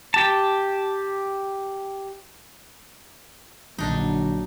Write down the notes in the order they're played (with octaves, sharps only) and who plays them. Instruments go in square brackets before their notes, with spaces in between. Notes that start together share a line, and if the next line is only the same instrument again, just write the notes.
[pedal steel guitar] G4 A5
[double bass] A#1 [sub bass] D3 [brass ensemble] F#3 [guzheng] D4 D#4